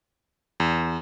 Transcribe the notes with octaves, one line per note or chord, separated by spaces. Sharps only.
E2